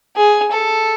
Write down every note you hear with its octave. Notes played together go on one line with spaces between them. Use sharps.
G#4
A4